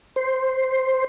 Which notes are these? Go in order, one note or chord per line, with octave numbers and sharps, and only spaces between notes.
C5